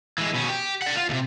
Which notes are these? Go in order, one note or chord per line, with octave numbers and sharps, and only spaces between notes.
E3 G#3
B2 C#4
G4
D5 F#5
F4
D#2 C3